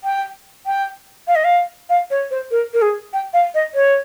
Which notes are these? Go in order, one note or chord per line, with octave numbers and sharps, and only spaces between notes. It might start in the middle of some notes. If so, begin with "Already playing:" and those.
G5
G5
F5
D#5
F5
F5
C#5
C5
A#4
A#4
G#4
G5
F5
D#5
C#5